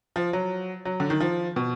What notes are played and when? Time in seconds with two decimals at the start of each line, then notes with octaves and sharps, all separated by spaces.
0.16 F3
0.33 F#3
0.85 F#3
1.00 D3
1.10 D#3
1.20 F3
1.56 B2